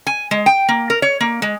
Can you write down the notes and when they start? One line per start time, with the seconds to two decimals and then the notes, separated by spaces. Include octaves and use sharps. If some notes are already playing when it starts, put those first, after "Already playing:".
0.07 G#5
0.31 G#3
0.46 G5
0.69 A#3
0.90 A#4
1.02 C#5
1.21 A#3
1.42 G#3